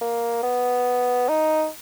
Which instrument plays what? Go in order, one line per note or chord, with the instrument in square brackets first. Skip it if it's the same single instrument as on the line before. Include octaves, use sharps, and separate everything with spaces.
[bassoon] A#3
B3
D#4